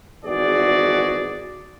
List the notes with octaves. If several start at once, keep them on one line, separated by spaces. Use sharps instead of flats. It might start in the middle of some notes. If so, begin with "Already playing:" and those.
G#1 E2 F#4 G#4 D5